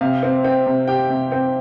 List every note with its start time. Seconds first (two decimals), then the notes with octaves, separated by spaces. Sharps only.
0.01 C3 F5
0.23 C4
0.44 C4 G5
0.66 C3
0.88 G4 G5
1.10 C3
1.31 C4 G5